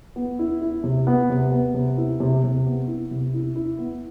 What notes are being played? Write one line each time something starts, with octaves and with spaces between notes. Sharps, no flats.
B3
E4
E4
C3
B3
C3
B3
C3
E4
C3
C3
B3
E4
C3
E4
E4
B3